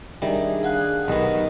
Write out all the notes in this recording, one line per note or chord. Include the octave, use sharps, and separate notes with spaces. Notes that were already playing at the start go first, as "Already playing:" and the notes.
D#3 G3 D4 G#4 E5
F5 F#5 F#6
B1 D#3 B3 G4